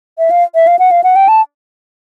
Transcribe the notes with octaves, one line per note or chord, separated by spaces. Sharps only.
E5
F5
E5
F5
F#5
F5
F#5
G5
A5